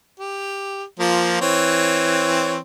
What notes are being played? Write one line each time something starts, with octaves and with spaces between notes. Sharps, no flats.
G4
F3 A#3 F4
E3 C4 C#5